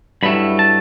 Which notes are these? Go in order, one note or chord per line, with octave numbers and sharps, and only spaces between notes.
G2 F#3 A3 E4 B5
A5